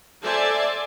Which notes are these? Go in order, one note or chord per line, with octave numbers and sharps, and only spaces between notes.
A4 C5 D5 E5 G#5 A5